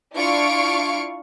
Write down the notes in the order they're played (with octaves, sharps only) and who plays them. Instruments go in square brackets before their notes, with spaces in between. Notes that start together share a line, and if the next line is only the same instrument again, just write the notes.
[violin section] D4 E4 F4 F5 C#6 D7